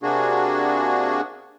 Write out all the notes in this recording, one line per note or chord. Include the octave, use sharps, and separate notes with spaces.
C3 A#3 D4 F#4 G#4